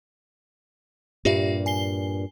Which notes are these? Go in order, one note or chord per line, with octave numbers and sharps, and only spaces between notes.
G2 A#2 F4 G4 E5
G#5 C7 G7